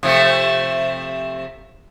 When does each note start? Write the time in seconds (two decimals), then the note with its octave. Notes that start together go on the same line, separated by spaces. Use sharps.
0.03 C3 F3 A3